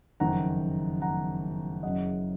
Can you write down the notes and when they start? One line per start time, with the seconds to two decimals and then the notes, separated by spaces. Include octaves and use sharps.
0.20 F#1 F2 D#3 F#5 A#5
1.02 F#5 A#5
1.83 F#1 F#2 C#3 D#5 F#5